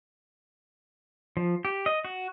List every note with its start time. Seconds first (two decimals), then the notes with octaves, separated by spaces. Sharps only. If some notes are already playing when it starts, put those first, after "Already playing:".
1.37 F3
1.65 G4
1.86 D#5
2.05 F#4